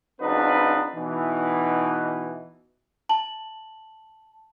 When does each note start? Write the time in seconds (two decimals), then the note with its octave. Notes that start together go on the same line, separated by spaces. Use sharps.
0.21 C#2 F#3 C4 D4 D#4 B4
0.95 B2 E3 D#4
3.09 A5 F#7